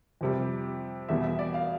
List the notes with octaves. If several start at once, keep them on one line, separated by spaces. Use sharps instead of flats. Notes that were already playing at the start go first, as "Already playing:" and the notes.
F2 C3 G3
E2 B2 G3 E5
E5
D5
F5